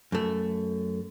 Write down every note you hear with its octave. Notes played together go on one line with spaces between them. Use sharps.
F#2 A3